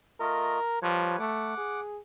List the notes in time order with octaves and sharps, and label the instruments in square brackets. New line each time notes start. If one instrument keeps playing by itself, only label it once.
[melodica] A3 F4 D#5 [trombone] A#4
[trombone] F3 [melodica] G3 B4 C#5
[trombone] A3 [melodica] F#5 D6
[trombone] G#4